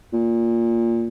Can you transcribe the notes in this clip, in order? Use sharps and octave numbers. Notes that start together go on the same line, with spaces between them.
A#2